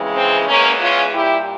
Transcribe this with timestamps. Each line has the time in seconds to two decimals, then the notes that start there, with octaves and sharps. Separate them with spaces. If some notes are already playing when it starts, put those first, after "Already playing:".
Already playing: F2 C#3 E3 G#3
0.16 C4
0.48 E2 E3 G#3 A#3 C#4
0.80 C#4 F4
1.13 A#2 G3 E4 G4